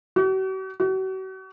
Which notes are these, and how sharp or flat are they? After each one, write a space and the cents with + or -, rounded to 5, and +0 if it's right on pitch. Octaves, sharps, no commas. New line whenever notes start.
F#4 +45
F#4 +40